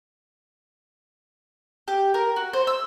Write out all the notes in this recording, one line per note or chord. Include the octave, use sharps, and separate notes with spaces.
G4
A#4
F#4
C5
E6